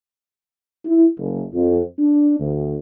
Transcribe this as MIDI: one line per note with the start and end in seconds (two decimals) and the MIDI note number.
0.85 1.06 64
1.18 1.44 30
1.54 1.81 41
1.99 2.36 62
2.40 2.77 38